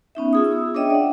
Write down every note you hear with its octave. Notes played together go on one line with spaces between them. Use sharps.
B3 C#4 D#4 E5
F4 G#4 D#6
E6
D4 G#4 C#5 D#5 E5 G5
D5 F#5